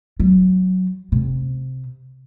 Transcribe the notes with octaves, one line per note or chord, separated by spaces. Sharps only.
F#3
C3